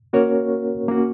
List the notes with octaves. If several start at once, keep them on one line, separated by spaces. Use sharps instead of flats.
A#3 C#4 F#4 A#4 C#5
A#3 C#4 F#4